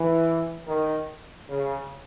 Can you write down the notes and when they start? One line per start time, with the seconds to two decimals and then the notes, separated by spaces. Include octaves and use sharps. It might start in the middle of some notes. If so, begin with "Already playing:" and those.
Already playing: E3
0.67 D#3
1.49 C#3